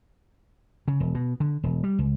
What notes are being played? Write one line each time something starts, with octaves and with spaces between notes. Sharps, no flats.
C#3
E1
B2
D3
E1
G3
C#2